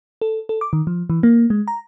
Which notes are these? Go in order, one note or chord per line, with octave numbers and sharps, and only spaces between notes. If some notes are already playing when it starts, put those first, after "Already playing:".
A4
A4
D6
D#3
F3
E3
A#3
G#3
A#5